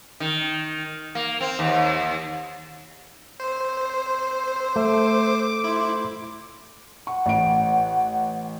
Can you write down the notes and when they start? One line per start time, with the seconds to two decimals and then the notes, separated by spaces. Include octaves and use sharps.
0.20 D#3
1.15 A#3
1.40 C4
1.59 D#2
3.40 C4 C5
4.76 A3 D6
5.64 E4 C5
7.07 F#5 C#6
7.26 A1 D7